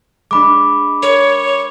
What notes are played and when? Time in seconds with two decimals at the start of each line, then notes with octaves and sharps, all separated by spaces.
0.31 G#3 D4 B5 D6
1.02 A#4 C#5